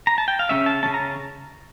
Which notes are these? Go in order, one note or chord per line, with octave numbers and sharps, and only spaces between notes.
A#5
A5
G5
F5
C#3 G3 C#4 E5
A5
C#3 G3 C#4 A5
A#5